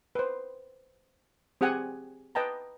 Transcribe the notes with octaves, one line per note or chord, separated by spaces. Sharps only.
B4 C5
C4 G4 G#4 F#5 G#5
B4 D#5 G5 A5 A#5